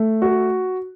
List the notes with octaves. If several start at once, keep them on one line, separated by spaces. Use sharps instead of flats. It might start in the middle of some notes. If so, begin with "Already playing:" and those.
Already playing: A3
F#4